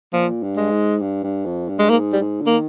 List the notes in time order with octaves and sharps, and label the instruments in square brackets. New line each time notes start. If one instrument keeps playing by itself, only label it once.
[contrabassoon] A#2 [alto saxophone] F3
[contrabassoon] G2
[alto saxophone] G#3
[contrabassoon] G#2
G2
G2
F2
G2
[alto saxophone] G#3
[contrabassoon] G#2 [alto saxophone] A#3
[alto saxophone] G3
[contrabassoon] G#2
D3
[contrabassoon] D#3 [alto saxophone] A#3